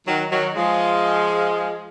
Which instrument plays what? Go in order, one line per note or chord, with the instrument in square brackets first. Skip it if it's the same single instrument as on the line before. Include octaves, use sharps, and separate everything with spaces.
[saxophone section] D#3 F#3
D#3 F#3
F3 G#3